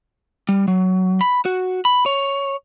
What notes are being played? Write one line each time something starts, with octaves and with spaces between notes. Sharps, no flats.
G3
F#3
B5
F#4
B5
C#5